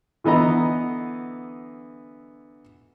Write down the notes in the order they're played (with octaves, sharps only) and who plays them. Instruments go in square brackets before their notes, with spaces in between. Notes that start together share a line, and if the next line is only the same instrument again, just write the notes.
[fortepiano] D3 E3 B3 D#5 A#5